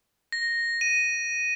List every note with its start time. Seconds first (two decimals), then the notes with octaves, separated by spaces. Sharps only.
0.32 A#6
0.81 D#7